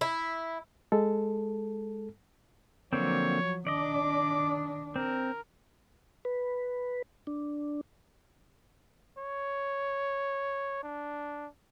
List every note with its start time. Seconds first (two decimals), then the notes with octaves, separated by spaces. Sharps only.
0.01 E4
0.92 G#3 A4
2.93 D3 F3 F#3 A#3 C4 C#5
3.67 D#3 D4 D5 D#5 D6
4.96 C4 A#4
6.25 B4
7.27 D4
9.18 C#5
10.83 D4